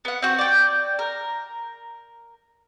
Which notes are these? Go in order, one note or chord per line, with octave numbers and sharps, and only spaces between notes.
B3 F#5
C4 F#4
D5 G5
A#4